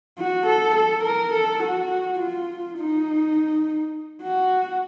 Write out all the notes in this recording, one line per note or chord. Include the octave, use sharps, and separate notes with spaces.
F#4
A4
A4
A#4
A4
F#4
F4
D#4
F#4